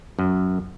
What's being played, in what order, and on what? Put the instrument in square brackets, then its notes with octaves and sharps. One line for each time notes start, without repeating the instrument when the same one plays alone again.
[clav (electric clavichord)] F#2